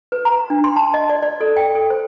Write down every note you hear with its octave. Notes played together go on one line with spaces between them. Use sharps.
B4
A#5
D4
C6
A5
D#5
D5
D5
A4
G5
A4
C5